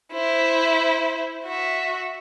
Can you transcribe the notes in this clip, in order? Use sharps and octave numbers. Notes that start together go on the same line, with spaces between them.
E4 C5
F#4 E5